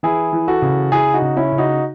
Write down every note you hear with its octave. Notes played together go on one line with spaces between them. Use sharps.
E3 E4 G#4
E3
F#4 A4
C#3
C#3 E4 G#4
D#4 F#4
C#3
C#4 E4
C#3
D#4 F#4